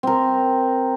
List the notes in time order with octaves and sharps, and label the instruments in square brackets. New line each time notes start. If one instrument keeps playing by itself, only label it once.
[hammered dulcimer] C4 A#4